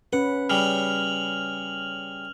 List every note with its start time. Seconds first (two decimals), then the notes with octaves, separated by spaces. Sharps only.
0.13 C#4 B4 F#5
0.49 C#3 G3 F6 F7 F#7